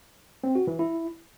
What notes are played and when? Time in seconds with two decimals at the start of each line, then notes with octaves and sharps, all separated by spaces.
0.44 C4
0.55 F#4
0.67 E3
0.79 E4